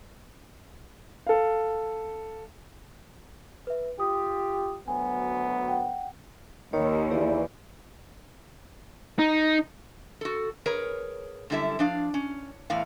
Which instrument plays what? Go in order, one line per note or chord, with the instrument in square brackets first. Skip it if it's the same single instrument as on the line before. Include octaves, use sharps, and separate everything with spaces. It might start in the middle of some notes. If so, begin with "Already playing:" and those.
[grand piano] A4 F5
[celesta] B4 E5
[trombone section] F4 G4 [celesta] D#6
[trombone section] D2 F#3 B3 [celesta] G#5
[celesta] F#5 G5
[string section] D#2 [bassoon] D#3 [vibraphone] C#5 B5
[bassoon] E2 [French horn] E3 [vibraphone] G4 D5
[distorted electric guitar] D#4
[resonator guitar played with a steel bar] F#4 A4
G#4 A#4 B4 C#5
F#2 D3 G3 E4 A4 E5
F3 D4 F5
C#4
E2 A2 F5